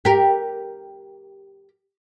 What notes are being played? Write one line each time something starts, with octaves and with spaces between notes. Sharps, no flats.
G4 A#4